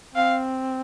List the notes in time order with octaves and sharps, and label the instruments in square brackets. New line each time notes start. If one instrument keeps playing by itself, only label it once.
[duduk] C4 [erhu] F5